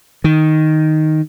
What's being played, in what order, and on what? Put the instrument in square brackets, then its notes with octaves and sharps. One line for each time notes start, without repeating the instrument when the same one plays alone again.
[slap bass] D#3